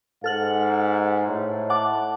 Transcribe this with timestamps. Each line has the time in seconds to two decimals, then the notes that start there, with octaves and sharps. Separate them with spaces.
0.24 G#2 A4 F#5 F6 F#7
1.27 A2
1.70 F#5 A5 D6